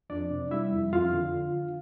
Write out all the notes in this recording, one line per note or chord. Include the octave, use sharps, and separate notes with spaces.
F2 D4 D5
C3
G3 E4 E5
F2
F2 F4 F5
D3